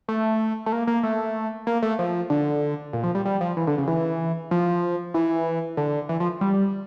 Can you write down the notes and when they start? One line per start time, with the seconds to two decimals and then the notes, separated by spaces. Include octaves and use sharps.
0.08 A3
0.66 A3
0.72 A#3
0.87 A#3
1.03 A3
1.67 A#3
1.82 A3
1.99 F3
2.30 D3
2.93 A#2
3.04 F3
3.15 G3
3.25 G3
3.41 F3
3.57 E3
3.67 D3
3.78 C#3
3.88 E3
4.51 F3
5.14 E3
5.77 D3
6.09 E3
6.20 F3
6.41 G3